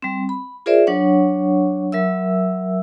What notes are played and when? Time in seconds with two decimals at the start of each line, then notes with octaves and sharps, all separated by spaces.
0.02 G3 C4
0.29 B5
0.66 F4 G#4 A#4 C5 D5 E5
0.87 F#3 D4 C#5 F#5 C#6
1.92 F#3 A#4 E5 E6